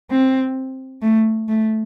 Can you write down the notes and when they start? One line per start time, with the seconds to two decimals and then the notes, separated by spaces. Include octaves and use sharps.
0.11 C4
1.02 A3
1.48 A3